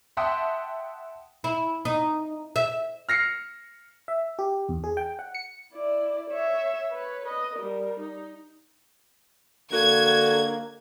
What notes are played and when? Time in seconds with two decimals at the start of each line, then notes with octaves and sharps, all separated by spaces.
0.17 E5 F#5 G5 A5 C6 D#6
1.44 E4
1.85 D#4
2.56 E5
3.09 F6 A#6 C7 C#7
4.08 E5
4.39 G4
4.69 E2
4.84 G#4
4.97 G5
5.19 F#5
5.35 C#7
5.73 E4 D5
6.30 C#5 E5
6.92 B4 C#5
7.26 B4 D#5
7.55 G3 A#4
8.00 D#4
9.73 D3 A#3 F#4 G#6